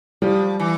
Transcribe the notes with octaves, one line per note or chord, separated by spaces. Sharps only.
F3 G3
E3